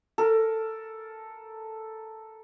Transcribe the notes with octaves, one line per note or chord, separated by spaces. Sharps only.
A4 A#4